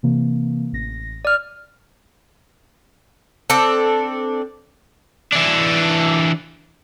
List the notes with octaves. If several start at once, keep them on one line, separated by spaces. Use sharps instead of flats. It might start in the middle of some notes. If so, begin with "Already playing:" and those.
C3 E3 A#3
A1 A#6
D5 F6
C4 D4 A4
E3 D4